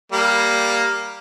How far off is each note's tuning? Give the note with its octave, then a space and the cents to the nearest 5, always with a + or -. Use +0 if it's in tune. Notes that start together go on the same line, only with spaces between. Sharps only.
G3 +0 A#3 +0